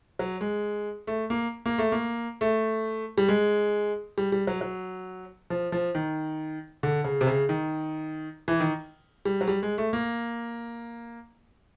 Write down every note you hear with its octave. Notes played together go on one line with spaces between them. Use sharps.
F#3
G#3
A3
A#3
A#3
A3
A#3
A3
G3
G#3
G3
G3
F#3
F#3
F3
F3
D#3
D3
C#3
C3
C#3
D#3
E3
D#3
G3
F#3
G3
G#3
A3
A#3